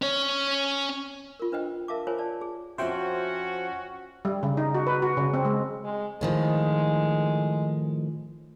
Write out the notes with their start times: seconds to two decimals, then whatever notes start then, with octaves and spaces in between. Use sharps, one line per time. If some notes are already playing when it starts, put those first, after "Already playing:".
0.02 C#4 C#5
1.40 F4 A#4
1.52 D4 B4 C5 D#5 G5
1.88 A#4 E5 F5 A5 D6
2.07 F4 A#4 C5 C#5 G#5
2.18 D5 A5
2.41 G#4
2.78 F2 C#4 F4 F#4 C5 E5 G5
4.25 G3
4.43 C#3
4.57 D#4
4.74 F#4
4.87 B4
5.02 F#4
5.17 C#3
5.34 C4
5.45 G#3
5.84 G#3
6.21 A2 D#3 F3 G#3